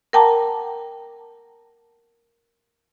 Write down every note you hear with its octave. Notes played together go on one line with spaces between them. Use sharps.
A#4 F#5 G5 A5 A#5 D6